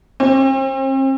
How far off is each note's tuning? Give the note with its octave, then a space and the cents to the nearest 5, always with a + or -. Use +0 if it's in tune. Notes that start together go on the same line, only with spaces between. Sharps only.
C4 +40